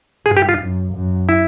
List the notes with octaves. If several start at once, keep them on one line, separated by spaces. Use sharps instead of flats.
G2 G#4
G4
F4
F#2
F#2
E4